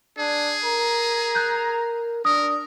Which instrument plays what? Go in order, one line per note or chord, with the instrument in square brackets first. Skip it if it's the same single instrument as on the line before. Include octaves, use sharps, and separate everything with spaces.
[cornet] D4 [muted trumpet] G#4
[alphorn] A#4 [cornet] A#5
[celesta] F#6 G6
[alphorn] D4 [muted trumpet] A#4 [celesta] D#6